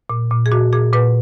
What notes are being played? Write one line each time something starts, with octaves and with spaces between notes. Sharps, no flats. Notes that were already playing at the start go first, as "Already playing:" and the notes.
A#2
A#2
G#4
A#2 F#4
A#2 G#4
A#2 B4